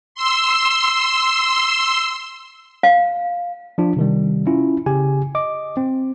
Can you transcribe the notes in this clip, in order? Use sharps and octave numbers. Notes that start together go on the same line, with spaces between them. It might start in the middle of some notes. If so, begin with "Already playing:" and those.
C6 E6
F5
F3 D4 F4
C3 D#3 G3
C#4 E4 F4
C#3 G4 G#5
D#5 D6
C4